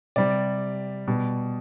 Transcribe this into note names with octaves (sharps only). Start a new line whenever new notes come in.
C3 G3 D5
B2 G3